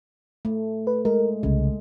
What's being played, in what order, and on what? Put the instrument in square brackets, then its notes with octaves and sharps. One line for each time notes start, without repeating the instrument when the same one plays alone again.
[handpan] A3
[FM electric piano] B4
[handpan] G#3 [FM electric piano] A#4
[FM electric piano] C2 C#3 [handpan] G#3